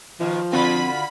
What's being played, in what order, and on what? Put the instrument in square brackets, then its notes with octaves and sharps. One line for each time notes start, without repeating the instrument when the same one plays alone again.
[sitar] B2 D#3 [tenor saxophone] F3
[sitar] D3 F4 F#4 [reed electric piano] C4 [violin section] B5